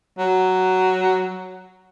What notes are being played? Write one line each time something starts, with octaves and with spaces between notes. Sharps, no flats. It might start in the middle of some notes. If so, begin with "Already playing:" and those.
F#3